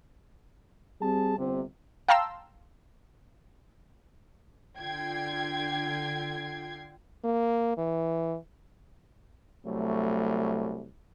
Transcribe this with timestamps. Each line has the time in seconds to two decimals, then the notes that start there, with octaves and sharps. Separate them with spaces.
1.01 G3 C4 G#4 A5
1.38 G1 C3
2.08 F5 G5 A5 A#5 C6 E6
4.77 D3 F4 G5 G#6 C7
7.24 A#3
7.77 E3
9.66 C2 F#3 A3